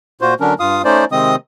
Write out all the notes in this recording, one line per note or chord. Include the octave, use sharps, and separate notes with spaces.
A#2 F4 F#4 C5
D3 F#3 C#4 D4 A#4
G2 F4 F5 D#6
A3 C#4 D#4 C5 D5
C3 D#3 G#3 C4 D#5 D#6